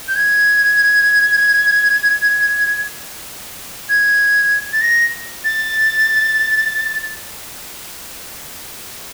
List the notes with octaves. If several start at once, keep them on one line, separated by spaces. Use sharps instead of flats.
G6
G#6
G#6
A6
A#6
A6